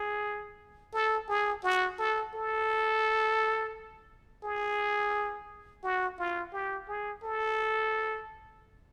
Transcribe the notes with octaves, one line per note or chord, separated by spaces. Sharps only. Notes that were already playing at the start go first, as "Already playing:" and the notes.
Already playing: G#4
A4
G#4
F#4
A4
A4
G#4
F#4
F4
G4
G#4
A4